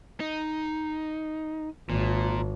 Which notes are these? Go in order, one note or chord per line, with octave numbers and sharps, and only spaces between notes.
D#4
G#1 A#2